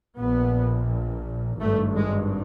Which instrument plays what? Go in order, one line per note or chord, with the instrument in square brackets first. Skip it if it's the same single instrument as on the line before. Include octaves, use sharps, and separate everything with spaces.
[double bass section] A#1 A#2 B3
G#1 G2 A3
G#3